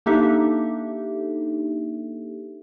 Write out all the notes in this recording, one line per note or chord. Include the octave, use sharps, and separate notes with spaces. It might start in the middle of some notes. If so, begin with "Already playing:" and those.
A#3 D4 D#4 G4 A4 E5